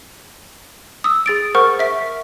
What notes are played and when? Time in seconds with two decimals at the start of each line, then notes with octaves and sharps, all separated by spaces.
1.04 D#6 E6
1.26 G#4 A6 D7
1.55 A#4 C5 F#5 C#6 F6
1.79 E5 B6